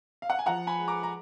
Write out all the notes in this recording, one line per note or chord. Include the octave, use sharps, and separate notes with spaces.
F5
F#5
G#5
F3 F#5 A#5
G#5 B5
G#3
A#5 D6
A#5